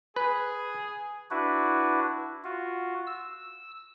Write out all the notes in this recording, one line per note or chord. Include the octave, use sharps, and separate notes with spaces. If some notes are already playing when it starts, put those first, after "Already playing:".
G#4 B4
D4 E4 F#4 B4
F4 F#4
E6